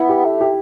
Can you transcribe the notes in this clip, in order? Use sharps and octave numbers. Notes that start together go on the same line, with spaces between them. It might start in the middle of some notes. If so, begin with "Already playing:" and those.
Already playing: B3 E4
G4
A3
G4